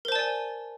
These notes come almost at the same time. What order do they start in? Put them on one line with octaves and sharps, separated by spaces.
A#4 C5 A5 D5 G#5